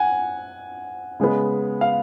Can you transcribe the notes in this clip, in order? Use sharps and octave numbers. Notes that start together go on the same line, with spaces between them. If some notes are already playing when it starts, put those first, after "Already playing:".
Already playing: F#5 G#5
C#3 G#3 B3
F5